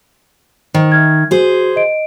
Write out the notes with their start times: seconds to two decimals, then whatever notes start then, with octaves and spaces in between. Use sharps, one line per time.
0.74 D#3 C5
0.92 E5 F6 G#6
1.31 F#4 G#4 C5
1.76 D#5 D7